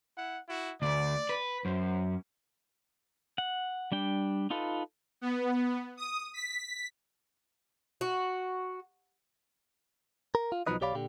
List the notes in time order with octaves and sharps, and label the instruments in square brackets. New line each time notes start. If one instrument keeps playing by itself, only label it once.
[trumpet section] E4 F#5
E4 F#4
[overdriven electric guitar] D2 [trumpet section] D5
[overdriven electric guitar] B4
[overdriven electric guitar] F#2 [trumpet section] C5
[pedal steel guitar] F#5
G3 D4 G5
D#4 F4 A4 B4
[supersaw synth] B3
D#6
B6
[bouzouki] F#4
[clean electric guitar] A#4
F4
B1 F3 F#3 D#4 B4 D#5
B1 G4 C#5 D5 F5 B5
A#2 D3 G4